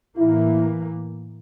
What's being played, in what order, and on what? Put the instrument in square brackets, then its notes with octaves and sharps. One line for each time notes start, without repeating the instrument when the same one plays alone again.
[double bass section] A2 E3 A#3 [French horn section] E4